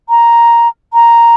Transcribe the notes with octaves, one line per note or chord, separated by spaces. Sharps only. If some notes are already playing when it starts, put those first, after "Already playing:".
A#5
A#5